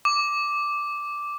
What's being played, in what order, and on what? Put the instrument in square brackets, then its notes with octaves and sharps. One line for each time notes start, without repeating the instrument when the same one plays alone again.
[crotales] D6